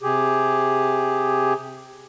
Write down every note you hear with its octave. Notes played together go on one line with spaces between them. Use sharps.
C3 G4 G#4